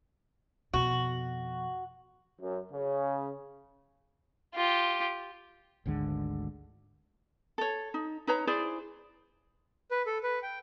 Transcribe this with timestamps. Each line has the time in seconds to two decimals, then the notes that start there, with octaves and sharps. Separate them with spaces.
0.74 F2 B2 F#4
2.41 F#2
2.71 C#3
4.55 F4 G4
5.86 G#1 D2 D3 G#3
7.58 A4 C#5
7.94 D#4
8.27 D#4 B4 C#5 A#5
8.47 E4 G#4 C5 D5
9.91 B4
10.07 A4
10.23 B4
10.43 G5